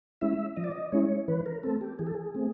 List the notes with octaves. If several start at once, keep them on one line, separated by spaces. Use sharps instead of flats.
G#3 C#4 E4 E5
F3 D#5
D5
D#5
G#3 C#4 E4 C#5
E3 B4
A#4
A3 C4 A4
G4
E3 G#4
A4
G#4
A3 C4